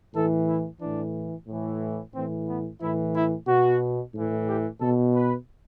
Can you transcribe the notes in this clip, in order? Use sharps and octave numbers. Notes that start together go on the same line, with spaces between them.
A2 E3 A4
E4
A2 E3 D4
A2 E3
A2 E3 C4
B3
A2 E3 E4
E4
B2 F#4
A2 E3
G4
B2 A4
B4